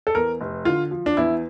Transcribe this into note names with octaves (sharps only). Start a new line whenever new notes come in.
A4
E2 A#4
F1
D3 F4
F3
D4
E2 E4